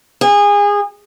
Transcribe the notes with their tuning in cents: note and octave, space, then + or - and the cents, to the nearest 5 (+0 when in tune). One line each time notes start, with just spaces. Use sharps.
G#4 -25